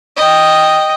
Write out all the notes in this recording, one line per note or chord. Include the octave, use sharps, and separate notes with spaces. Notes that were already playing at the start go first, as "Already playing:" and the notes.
D#5 G5